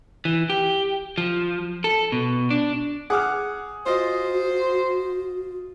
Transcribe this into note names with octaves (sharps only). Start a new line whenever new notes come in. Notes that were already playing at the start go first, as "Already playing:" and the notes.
E3
G4
F3
A4
B2
D4
G#4 F#5 D6 F6
F4 F#4 C5 D#5